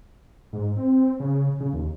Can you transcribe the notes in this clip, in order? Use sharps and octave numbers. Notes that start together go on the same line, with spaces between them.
G#2
C4
C#3
C#3
D#2